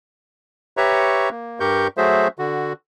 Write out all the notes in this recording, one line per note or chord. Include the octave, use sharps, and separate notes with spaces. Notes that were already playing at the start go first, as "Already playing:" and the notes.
G4 B4 C#5 E5 A#5 C#6
A#3
G2 G4 A#4 C#6 G6
F#3 A3 F#4 G#4 C5 E5
D3 F#4